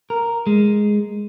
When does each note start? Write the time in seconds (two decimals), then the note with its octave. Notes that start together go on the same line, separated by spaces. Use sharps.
0.10 A#4
0.47 G#3